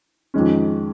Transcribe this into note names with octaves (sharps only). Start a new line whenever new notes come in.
F2 D#3 G#3 C#4